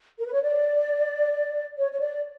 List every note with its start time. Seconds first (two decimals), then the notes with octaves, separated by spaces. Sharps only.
0.18 A#4
0.26 B4
0.33 C#5
0.42 D5
1.78 C#5
1.92 C#5
2.00 D5